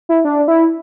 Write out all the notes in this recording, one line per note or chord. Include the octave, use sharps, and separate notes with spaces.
E4
D4
E4